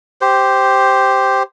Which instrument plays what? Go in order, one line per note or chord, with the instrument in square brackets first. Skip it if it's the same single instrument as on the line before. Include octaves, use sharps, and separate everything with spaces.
[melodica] G4 C5